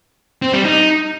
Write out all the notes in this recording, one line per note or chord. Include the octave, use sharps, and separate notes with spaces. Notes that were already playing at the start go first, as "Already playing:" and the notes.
C4
G3
D#4